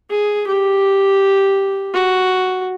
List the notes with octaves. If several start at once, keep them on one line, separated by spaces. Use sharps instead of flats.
G#4
G4
F#4